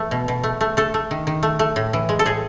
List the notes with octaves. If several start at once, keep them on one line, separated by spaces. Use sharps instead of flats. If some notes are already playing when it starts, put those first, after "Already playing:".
Already playing: E3 A3
B2
B2
A3
A3
A3 A4
A3
D#3
D#3
A3
A3
A2
E3
G#3
A4
A2 G#4